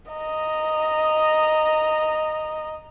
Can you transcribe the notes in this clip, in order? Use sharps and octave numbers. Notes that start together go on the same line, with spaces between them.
D#5 A#5